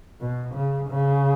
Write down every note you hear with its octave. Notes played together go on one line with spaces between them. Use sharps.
B2
C#3
C#3